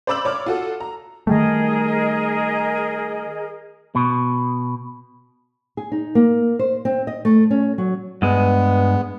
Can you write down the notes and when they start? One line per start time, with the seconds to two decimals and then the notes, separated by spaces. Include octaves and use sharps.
0.07 C5 D5 B5 D6 E6 F#7
0.25 C#5 D5 D6 F6
0.46 F4 F#4 A4
0.80 A#5
1.27 D#3 G3 A3 G#4 A#4 D#5
3.95 B2
5.77 G#4
5.92 D#4
6.15 A#3
6.59 C5
6.85 C4
7.07 D#5
7.25 A3
7.51 C#4
7.78 F#3
8.22 G2 G#3 B3